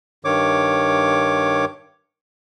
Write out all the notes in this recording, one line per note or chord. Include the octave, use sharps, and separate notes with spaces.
G2 D#3 C#5 D6